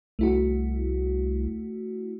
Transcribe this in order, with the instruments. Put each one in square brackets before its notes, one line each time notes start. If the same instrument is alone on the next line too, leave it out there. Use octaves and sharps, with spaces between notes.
[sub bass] C2 [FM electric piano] A3 E4 F#4